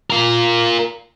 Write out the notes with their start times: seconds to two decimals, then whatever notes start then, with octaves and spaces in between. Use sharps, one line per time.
0.10 F4 A#4